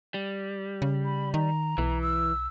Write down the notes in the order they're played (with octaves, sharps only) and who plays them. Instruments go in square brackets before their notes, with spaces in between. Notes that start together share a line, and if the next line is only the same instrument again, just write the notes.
[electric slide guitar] G3
[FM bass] C#3
[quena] B5
[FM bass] D#3 [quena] A#5
[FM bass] B1 [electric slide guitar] E3
[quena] E6